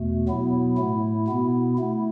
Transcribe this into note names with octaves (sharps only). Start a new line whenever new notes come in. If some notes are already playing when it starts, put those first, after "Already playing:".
Already playing: E2 B2 A3
B2 F#3 B3 E4
A2 A3 E4
B2 B3 E4
A3 E4